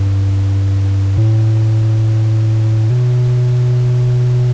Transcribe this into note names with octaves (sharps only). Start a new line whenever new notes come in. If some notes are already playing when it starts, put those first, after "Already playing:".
Already playing: G2
A2
B2